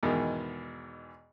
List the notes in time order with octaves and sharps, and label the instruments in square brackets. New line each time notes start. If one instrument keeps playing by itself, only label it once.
[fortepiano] E2 G#2 B2 D#3